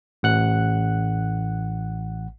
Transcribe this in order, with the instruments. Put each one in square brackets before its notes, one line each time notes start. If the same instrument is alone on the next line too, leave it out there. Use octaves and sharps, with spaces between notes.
[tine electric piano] A1 F#5 F#6